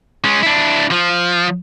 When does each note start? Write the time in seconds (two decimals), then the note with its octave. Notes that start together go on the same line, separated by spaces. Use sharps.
0.24 G#3 C#4
0.43 D4 E4
0.91 F3